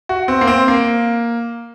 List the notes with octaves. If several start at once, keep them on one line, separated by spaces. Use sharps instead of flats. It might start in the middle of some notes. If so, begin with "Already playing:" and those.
F#4
C4
A#3
C4
A#3